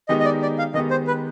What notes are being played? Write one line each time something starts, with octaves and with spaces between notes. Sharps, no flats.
D#3 G#3 B3 D#4 G4 D#5
D#5
D5
D5
F5
D#3 G#3 B3 D#4 G4 D#5
C5
B4